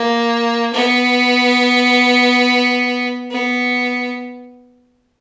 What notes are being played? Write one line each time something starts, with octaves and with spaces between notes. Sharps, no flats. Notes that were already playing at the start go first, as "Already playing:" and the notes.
Already playing: A#3
B3
B3